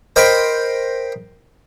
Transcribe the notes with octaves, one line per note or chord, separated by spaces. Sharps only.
A#4 C5 D#5 G5 B5